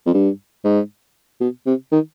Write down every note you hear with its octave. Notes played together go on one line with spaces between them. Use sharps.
F2
G2
G#2
B2
C3
D#3